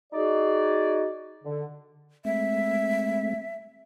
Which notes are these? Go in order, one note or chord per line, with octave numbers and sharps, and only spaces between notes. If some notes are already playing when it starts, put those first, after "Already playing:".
D#4 F#4 G#4 D5
D3
G#3 A3 C4 E5